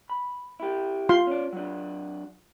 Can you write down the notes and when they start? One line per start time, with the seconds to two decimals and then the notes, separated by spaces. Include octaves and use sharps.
0.10 B5
0.60 E4 G4
1.09 F4 F5 C6
1.27 C#4 D5
1.53 F#3 D4